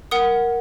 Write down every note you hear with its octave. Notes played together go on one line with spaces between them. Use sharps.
A#4 F#5 D#6